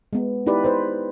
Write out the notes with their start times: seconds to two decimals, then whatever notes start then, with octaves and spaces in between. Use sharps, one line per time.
0.13 G#3 B3
0.46 D#4 E4 G4 B4 D5
0.64 B4 C5